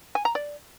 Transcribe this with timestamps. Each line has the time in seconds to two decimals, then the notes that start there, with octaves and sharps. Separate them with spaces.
0.15 G#5
0.25 A#5
0.35 D5